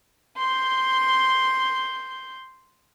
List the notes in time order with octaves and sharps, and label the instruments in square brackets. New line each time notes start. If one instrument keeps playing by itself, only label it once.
[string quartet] C6 G6